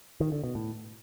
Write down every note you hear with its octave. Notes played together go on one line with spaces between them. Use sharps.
D#3
D3
B2
A2